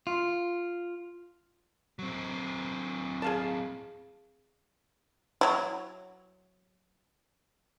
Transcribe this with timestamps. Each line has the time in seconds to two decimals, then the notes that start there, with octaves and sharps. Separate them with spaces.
0.07 F4
1.99 F#3 C4
3.22 G#4 F5 A5
5.41 F#3 E4